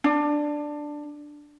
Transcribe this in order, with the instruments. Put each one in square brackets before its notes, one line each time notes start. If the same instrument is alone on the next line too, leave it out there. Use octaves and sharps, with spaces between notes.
[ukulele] D4